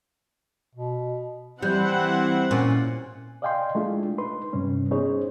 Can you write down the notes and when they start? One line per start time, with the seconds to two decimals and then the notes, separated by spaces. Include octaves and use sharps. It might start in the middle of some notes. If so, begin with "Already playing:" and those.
0.75 B2
1.62 E3 G3 C4 E4 F#5
2.51 A#2 C#4
3.42 D5 D#5 F5 G5 G#5 C6
3.75 G#3 A3 D4 E4 F4
4.18 D#4 B4 C6
4.53 G2 C3 G3 C#4
4.91 B3 C#4 D#4 G#4 C5 C#5